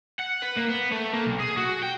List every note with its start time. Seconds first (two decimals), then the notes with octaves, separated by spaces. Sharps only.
0.20 F#5
0.43 B4
0.57 A#3
0.70 B3
0.92 A3
1.14 A#3
1.26 B1
1.40 G#4
1.57 F#4
1.83 G5